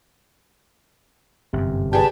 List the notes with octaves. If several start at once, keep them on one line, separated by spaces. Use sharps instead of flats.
G1 F#2 C3
G4 G#4 B4 D5 A5